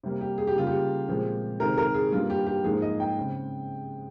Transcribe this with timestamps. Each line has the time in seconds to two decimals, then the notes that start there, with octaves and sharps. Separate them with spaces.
0.03 C3 G3 A#3
0.21 G4
0.38 G#4
0.47 G4
0.55 C#3 G3 A#3 F4
0.67 G4
1.08 A#2 F3 G#3 C4
1.60 C3 D#3 G#3 C4 A#4
1.77 A#4
1.94 G#4
2.12 G2 G3 A#3 F4
2.30 G4
2.47 G4
2.64 G#2 F3 A#3 G#4
2.82 D#5
3.00 G5
3.17 C#3 G#3 C4